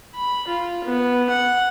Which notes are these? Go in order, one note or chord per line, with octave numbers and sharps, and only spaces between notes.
B5
F4
B3
F#5